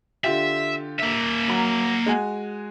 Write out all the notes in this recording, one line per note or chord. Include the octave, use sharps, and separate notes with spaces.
D3 F4 G4 E5
A#3 E5
F#3 A#5
G#3 F#4 G#5